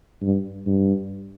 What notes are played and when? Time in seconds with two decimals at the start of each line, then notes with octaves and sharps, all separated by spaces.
0.22 G2
0.66 G2